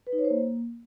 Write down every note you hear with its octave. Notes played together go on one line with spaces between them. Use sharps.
B4
D#4
C#5
C5
A#3